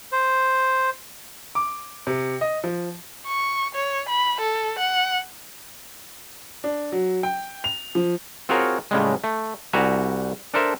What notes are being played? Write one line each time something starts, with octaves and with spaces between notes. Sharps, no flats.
C5
D6
C3
D#5
F3
C#6
C#5
B5
A4
F#5
D4
F#3
G5
F7
F3
C4 F4 F#4 G#4 A#4 C#5
A2 C#3 G3 G#3
A3
C2 G3 F#4 E5 G#5 A#5
D4 A4 A#4 C5 E5